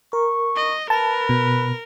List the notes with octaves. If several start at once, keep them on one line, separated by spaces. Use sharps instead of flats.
A#4 C#6
D#5
A#4 B4 A5
B2